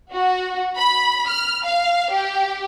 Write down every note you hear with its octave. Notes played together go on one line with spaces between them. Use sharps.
F#4
B5
F6
F5
G4